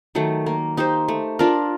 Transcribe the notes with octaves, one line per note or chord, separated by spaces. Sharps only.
D#3 F#3 A3
A#3
D#4 G4 C5
A3
D4 F4 A#4